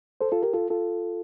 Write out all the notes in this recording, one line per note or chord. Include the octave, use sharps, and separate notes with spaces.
A4 C5
F4 A4
G4 A#4
F4 A4
F4 A4